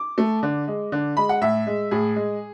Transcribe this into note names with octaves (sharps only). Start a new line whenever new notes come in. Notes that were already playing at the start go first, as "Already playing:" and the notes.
Already playing: D6
A3
D3
G#3
D3
G#3 B5
F#5
A2 E5
G#3
A2 G#4
G#3